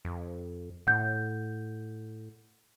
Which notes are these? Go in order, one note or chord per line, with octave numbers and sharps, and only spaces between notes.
F2
A2 F#5 G6